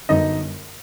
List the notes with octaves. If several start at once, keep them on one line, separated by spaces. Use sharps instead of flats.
G1 F#2 D3 D#4 D#5